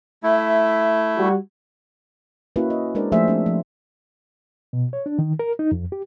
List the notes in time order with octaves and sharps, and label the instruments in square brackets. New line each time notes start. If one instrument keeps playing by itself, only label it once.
[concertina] A3 E4 [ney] E5
[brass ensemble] G3 F#4
[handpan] A#3 C#4 E4 F#4 B4
D#5
G#3 D4 A#4 C5 D5
F3 A3 A#3 G#4 C5 E5
C4 D4
F3
[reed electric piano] B2
C#5
D4
D#3
A#4
D#4
F2
G4